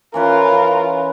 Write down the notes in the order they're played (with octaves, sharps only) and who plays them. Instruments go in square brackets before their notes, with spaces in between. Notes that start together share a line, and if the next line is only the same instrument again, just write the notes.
[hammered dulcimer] E3 C#4 B4 [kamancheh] F4 A#4